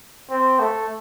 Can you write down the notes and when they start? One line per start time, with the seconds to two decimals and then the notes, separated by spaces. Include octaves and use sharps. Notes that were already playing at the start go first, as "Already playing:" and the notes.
0.30 C4
0.60 A3